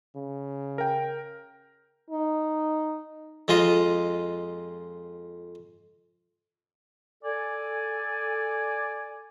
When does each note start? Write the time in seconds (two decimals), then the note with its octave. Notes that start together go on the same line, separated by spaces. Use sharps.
0.16 C#3
0.78 A#4 G5
2.10 D#4
3.48 F2 G#3 F4 D#5
7.24 A4 D5 G#5